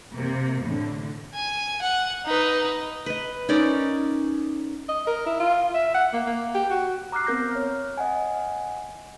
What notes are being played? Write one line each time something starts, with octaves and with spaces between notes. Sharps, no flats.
C3 A#3
A2 D3
G#5
F#5
D#4 B4
B4 D#5
C#4 D#4 A#4 D5
D#5
A#4
E4
F4
E5
F#5
A#3
A#3
G4
F#4
A#5 D6 F6 F#6 C7
B3 C4 A#4 G6 A#6
C#5 F6
D#5 F#5 G#5